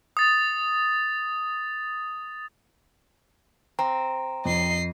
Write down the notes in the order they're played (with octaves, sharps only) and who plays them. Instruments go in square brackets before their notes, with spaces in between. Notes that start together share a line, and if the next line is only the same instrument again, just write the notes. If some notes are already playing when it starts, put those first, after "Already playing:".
[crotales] D#6 A6
[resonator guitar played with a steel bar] C4 [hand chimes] A#5
[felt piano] F2 [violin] D#5 C7